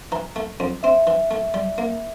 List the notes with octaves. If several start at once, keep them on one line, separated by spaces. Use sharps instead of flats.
E3 A#5
A3
F2
C4 E5
E3
A3
G3
A#3